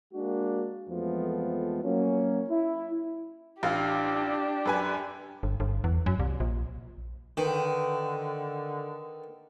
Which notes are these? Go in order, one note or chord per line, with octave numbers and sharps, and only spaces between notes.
G#3 A#3 D4 F#4
F2 E3 F3 G#3 A3 B3
F#3 A#3 C#4
E4
A1 D4 F4 G4 F5
F#2 B4 G#5
G1
G1
E2
F#2
C2
A#1
D3 D#3 B4 G5